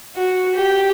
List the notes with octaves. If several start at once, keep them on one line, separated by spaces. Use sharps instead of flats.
F#4
G4